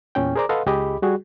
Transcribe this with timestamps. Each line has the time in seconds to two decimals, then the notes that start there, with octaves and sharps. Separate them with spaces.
0.15 E2 A#2 C#4 G5
0.36 G#4 A#4 C5 D5 A#5 D6
0.49 A4 B4 D#5 F5 F#5 C6
0.66 C#2 G4 G#4 D#5 B5 D6
1.02 G3 F#4 G#4